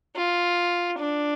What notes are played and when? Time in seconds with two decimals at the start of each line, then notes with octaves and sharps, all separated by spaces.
0.16 F4
0.99 D4